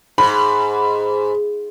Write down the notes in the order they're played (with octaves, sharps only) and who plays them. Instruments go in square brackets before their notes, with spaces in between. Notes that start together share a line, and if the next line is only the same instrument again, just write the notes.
[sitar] G#2 [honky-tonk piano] B5